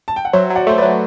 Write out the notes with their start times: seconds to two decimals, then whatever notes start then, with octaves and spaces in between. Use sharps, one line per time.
0.08 A5
0.16 G5
0.25 F#5
0.33 F#3 C5 E5
0.50 F#3
0.56 D5 F#5
0.67 A3 C5
0.78 F#3 B4 D5